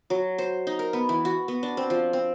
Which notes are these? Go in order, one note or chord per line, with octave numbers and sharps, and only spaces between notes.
F#3
C5
D#4
A#4
B3
E3
F#4
B3
D4
C4
F3
C4